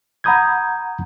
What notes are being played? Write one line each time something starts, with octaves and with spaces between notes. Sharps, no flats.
F#5 A#5 B5 D#6 G6 G#6